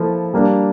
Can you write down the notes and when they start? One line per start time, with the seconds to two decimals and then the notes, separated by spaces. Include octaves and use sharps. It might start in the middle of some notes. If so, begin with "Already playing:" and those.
Already playing: F3 A#3 E4 A4
0.33 G3 A#3 D4